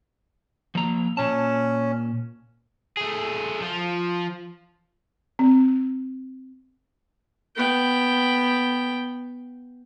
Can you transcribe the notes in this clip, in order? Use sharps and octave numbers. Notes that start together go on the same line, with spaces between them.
F3 A#3 A#5
A#2 C#4 A5
A3 G#4
F3 F4
C4
B3 G5